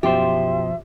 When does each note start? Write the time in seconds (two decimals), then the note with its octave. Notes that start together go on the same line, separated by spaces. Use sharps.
0.03 F#2 B2 F3 G4 C5 E5 C6